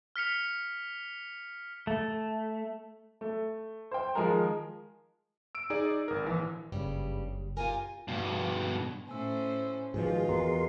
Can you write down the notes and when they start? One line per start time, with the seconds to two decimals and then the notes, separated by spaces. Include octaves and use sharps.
0.16 F6 B6 C#7 F7
1.87 A3
3.21 A3
3.91 C5 G5
4.15 D#3 F3 G#3 G#4 A#4
5.55 E6 D7
5.70 D#4 G#4 D5
6.08 G#1 A#4
6.23 A#1 E3
6.72 F#1 G2 C#3 G3
7.57 F4 G4 A#4 G#5
8.08 G2 B2
9.09 A2 C#4 C5 G#5 E6
9.94 G#2 D#3 F3 F4 F#4 G#4 B4 D#5
10.29 E2 B3 G#4 A#4 C6